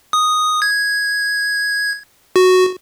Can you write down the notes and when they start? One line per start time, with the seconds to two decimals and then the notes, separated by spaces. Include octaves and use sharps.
0.13 D#6
0.62 G#6
2.36 F#4